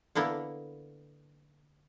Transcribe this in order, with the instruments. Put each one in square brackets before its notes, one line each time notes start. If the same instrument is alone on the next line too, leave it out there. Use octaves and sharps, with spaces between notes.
[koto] D3 A#3 B3 E4